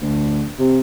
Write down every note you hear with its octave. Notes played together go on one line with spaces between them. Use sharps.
D2
C3